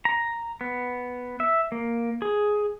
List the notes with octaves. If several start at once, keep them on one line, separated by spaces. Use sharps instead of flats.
A#5
B3
E5
A#3
G#4